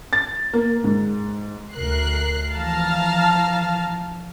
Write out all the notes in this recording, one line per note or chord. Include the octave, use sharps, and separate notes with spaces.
A6
A#3
G#2
D2 A#4 F#6 C7
E3 F3 F5 A5 A#5 F6